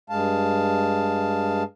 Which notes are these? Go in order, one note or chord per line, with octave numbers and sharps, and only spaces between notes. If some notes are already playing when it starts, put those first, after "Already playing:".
G2 G#3 F5 A5